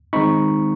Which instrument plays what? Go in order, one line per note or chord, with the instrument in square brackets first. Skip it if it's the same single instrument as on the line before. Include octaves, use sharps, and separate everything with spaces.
[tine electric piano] D#3 G#3 C4 D#4 B5 C#6